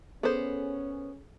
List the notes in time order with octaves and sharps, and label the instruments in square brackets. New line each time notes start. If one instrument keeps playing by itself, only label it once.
[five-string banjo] B3 C5 [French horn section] C#4 [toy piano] G#4 A4 D#5